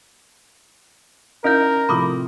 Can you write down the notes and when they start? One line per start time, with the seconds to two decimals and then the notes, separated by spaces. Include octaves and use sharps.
1.44 C#4 D#4 E4 A#4 G6
1.89 A2 C3 F3 B5 D6 D#6